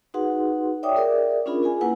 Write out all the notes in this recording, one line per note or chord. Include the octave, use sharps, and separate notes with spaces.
D#4 F#4 G#4 B4 F#5 C6
C#5 D5 E5 G5 D6 D#6
G#4 A#4 D5 E5
C#4 D4 F4 G#4 A#4 B5
F4 G#4 G#5
A#3 E4 B4 F#5 G#5